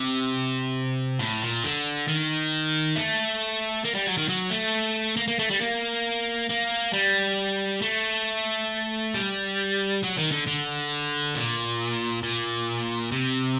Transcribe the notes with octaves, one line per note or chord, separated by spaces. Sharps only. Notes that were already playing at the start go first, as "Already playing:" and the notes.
Already playing: C3
A2
A#2
D3
D#3
A3
A#3
G3
F#3
D#3
F#3
A3
A#3
A#3
A3
G3
A#3
A#3
G3
A3
G3
F#3
D#3
D3
D3
A#2
A#2
C3